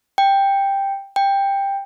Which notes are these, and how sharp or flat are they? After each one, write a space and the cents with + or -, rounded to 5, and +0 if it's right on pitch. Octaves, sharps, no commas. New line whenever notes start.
G5 +5
G5 +10